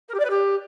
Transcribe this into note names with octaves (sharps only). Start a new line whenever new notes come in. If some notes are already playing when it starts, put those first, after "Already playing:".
A#4
G4
D5
B4
G4